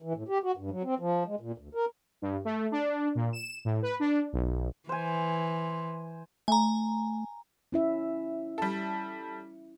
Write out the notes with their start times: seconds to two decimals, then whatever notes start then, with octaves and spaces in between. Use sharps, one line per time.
0.02 E3
0.15 A2
0.29 G4
0.43 F#4
0.57 G2
0.71 F#3
0.84 C4
1.00 F3
1.26 G#3
1.41 A#2
1.58 D2
1.75 A#4
2.22 G2
2.45 A3
2.72 D4
3.15 A#2
3.33 E7
3.65 A2
3.82 B4
4.00 D4
4.33 B1
4.89 E3 C5 G#5
6.48 A3 G#5 A#5
7.72 C#4 E4 E5
8.58 G3 A4